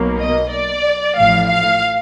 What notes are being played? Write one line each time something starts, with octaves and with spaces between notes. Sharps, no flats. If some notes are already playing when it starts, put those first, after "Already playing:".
Already playing: B1 B2 F#3 A#3
D#5
D5
A1 A2 F3 F5
F5